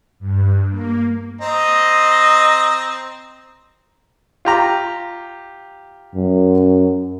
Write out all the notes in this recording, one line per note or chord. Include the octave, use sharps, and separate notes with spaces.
G2
A#3
C4 D#5 A#5
F4 G4 A#5
F#2